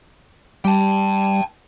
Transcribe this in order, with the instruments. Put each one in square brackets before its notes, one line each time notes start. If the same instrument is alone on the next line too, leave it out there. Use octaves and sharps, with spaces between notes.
[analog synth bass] G3 [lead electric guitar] G5 A5